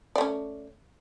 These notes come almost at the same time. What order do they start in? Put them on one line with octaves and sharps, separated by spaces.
D5 A3 C#4